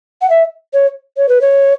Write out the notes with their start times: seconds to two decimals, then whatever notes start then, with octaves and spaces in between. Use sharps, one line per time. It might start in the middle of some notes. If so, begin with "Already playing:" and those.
0.22 F#5
0.30 E5
0.73 C#5
1.17 C#5
1.29 B4
1.41 C#5